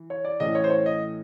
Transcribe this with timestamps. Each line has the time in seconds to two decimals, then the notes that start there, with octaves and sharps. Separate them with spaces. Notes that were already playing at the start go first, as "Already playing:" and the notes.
Already playing: E3
0.10 C#5
0.25 D5
0.40 A2 E3 A3 C#4 D#5
0.55 C#5
0.64 C5
0.70 C#5
0.86 D#5